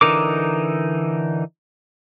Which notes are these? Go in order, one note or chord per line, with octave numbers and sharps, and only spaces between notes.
D3 E3 D#4 A#4 D6